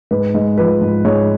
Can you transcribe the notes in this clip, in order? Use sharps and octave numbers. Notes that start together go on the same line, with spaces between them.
G#2 B4
G#2
F3 B4
G#2
G#2 C#5